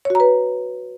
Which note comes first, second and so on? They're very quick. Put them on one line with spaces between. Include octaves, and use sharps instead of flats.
C#5 F#4 A#5 B4